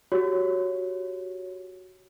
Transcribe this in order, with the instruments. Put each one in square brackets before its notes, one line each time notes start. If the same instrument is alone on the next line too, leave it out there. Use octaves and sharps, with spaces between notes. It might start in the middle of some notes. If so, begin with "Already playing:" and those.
[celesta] F#4 G4 C#5